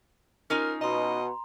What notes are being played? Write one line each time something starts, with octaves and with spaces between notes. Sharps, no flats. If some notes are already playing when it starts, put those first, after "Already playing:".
C#4 D#4 F4 A#4
B2 D#5 A#5 C6